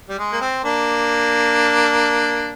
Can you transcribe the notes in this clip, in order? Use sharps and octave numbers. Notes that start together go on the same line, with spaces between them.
G3
G#3
A#3
C4
A#3 D4